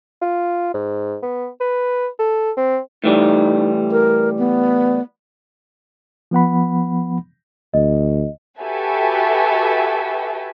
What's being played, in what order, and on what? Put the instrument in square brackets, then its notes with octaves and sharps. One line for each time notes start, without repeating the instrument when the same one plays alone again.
[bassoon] F4
G#2
B3
B4
A4
C4
[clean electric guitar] A2 E3 G3 [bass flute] D#4
[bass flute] A#4
B3
[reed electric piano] F3 B3 F#5 B5
[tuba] D2 [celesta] D#5
[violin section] F#4 G4 A4 B4 E5 G#5